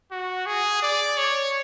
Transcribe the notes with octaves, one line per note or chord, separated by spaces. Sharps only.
F#4
G#4
D5
C#5